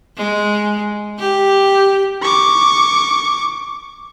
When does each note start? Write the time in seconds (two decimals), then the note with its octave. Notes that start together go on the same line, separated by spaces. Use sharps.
0.17 G#3
1.20 G4
2.22 C#6 D6